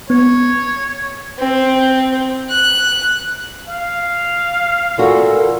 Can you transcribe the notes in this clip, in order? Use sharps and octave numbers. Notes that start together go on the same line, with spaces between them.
B3 C#5
C4
F#6
F5
A#2 E3 F#4 A4